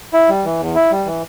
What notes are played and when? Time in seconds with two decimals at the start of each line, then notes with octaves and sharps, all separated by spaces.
0.13 E4
0.29 G3
0.45 E3
0.59 E2
0.75 E4
0.91 G3
1.06 E3